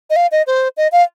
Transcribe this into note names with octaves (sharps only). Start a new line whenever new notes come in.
D#5
F5
D#5
C5
D#5
F5